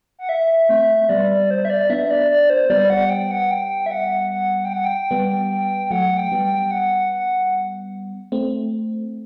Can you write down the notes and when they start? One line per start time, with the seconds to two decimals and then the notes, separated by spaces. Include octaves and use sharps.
0.19 F#5
0.29 E5
0.69 A3 C4 E5
1.09 G3 B3 D5
1.30 D5
1.51 C5
1.65 E5
1.70 D5
1.90 B3 D4 E5
2.05 E5
2.11 D5
2.30 D5
2.50 C5
2.70 G3 B3 D5
2.90 F#5
3.10 G5
3.31 F#5
3.51 G5
3.86 E5
3.91 F#5
4.31 F#5
4.58 F#5
4.65 G5
4.73 F#5
4.85 G5
5.11 G3 B3
5.86 G5
5.91 F#3 A3 F#5
6.17 G5
6.32 G3 B3
6.44 G5
6.71 F#5
7.12 F#5
8.32 A3 C4